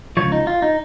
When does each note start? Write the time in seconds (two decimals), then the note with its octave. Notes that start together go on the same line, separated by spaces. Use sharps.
0.17 C#2 C#3 F3 C#5
0.32 D#4
0.47 F4
0.62 D#4